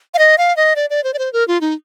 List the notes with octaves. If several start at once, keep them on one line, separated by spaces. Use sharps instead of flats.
F5
D#5
F5
D#5
D5
D5
C5
D5
C5
A#4
F4
D#4